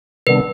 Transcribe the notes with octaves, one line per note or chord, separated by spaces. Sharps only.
C3 D#3 G3 B3 D4 B4